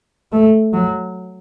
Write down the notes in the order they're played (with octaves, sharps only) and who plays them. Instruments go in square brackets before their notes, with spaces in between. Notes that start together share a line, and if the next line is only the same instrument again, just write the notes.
[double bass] A3
F#3